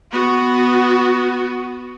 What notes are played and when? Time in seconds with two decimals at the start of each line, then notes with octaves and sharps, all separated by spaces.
0.11 B3 F#4